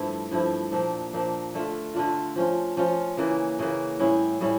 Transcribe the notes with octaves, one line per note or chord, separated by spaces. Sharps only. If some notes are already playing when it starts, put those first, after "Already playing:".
Already playing: G2 F3 A3 E4
G2 F3 A3 E4
A#2 F3 A#3 D4
A#2 F3 A#3 D4
D3 A3 D4 F4
D3 A3 D4 F4
F3 C#4 F4
F3 C#4 F4
C#3 E3 A#3
C#3 E3 A#3
A2 G3 C#4 E4
A2 G3 C#4 E4